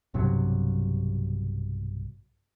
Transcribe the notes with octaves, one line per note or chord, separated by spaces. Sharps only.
B1 G2 C3 F#3